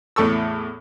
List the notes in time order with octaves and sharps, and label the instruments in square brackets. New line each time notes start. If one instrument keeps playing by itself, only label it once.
[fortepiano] E2 A2 A4 C#6 E6